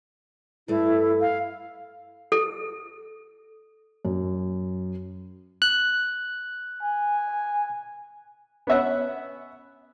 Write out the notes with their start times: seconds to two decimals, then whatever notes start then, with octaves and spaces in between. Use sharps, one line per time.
0.68 G2 A3 E4
1.21 F5
2.32 A4
4.05 F#2
5.62 F#6
6.83 G#5
8.67 B3 C#4 E5 F#5